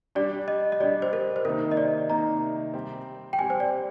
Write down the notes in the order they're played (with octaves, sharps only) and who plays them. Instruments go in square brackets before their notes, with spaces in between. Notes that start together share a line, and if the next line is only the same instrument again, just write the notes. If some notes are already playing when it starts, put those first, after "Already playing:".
[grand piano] G3 D4 G4 [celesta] D5
[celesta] D#5
D#5
[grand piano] G3 D4 G4 [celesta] D5
[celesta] C5
A#4
C5
[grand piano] C3 D#3 A#3 D#4 [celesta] A#4
[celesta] D#5
D5
[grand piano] C3 D#3 A#3 D#4 [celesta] A#5
[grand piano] G3 C4 G4
[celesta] G5
[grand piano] G3 C4 G4 [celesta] G#5
[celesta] C5
D5